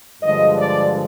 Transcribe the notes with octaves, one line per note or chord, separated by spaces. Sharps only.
G2 D3 F3 G#3 D#5
D5